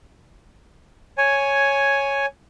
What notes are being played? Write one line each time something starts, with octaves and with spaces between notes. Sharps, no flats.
C#5 G#5